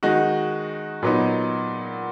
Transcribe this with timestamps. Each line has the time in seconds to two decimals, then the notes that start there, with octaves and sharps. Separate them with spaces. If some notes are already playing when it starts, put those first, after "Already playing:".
0.03 D#3 G#3 D#4 F#4
1.02 A#2 F#3 B3 D#4